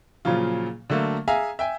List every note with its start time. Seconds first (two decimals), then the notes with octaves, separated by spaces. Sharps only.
0.25 A#2 C#3 F3 F#3 F4
0.90 D3 F#3 A3 A#3
1.28 G#4 E5 F5 G#5 A#5
1.59 E5 G5 G#5